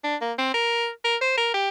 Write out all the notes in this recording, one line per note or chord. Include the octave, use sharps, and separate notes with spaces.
D4
A#3
C4
A#4
A#4
C5
A#4
G4